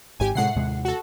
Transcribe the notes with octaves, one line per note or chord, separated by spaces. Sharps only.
G#1 G#2 G4 G#5
A2 C3 G#3 F#5 C7
D#2 C3 G#3
F#4 A4